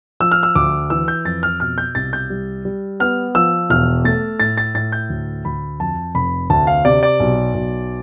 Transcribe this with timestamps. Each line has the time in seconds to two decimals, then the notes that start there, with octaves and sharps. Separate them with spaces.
0.20 F3 E6
0.32 F6
0.43 E6
0.55 D2 D6
0.90 E3 E6
1.08 G6
1.25 F2 A6
1.43 F6
1.60 B2 F6
1.78 G6
1.95 C2 A6
2.13 G6
2.30 G3
2.65 G3
3.00 B3 F6
3.35 F3 E6
3.70 E1 F6
4.04 A3 A6
4.40 A2 A6
4.57 A6
4.75 A2 A6
4.92 G6
5.10 D2
5.45 D2 B5
5.80 F2 A5
6.15 F1 B5
6.50 D2 A5
6.67 F5
6.85 C3 D5
7.03 D5
7.20 B1
7.54 B1